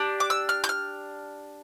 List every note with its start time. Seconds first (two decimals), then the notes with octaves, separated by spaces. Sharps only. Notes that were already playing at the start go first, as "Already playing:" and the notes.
Already playing: D4 G4
0.20 D6
0.30 E6
0.49 F6
0.64 G6
0.69 F6